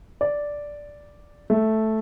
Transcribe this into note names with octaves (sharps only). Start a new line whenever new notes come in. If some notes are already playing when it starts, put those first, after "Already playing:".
D5
A3